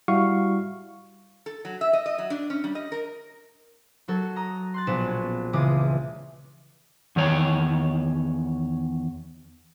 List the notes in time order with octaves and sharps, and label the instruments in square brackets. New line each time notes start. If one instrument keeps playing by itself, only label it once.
[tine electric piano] G3 E4 F#4 F5 C#6
[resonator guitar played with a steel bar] A4
F#3
E5
D#5
D#5
F#3
D4
C#4
G3
D#5
A#4
[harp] F#3 F#4 A4
A#5 D#6
C6 F#6 A6
A#1 B2 B3 B4 E7
C#4
C#2 C#3 E3 G#3 D6 D#6
[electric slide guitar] E2 D#3 C#5